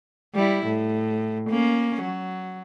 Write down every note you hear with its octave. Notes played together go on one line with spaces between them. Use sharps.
G3 E4
A2
A#3 C#4
F#3